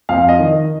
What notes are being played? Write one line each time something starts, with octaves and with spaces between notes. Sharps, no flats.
F2 F5
D#5
D#3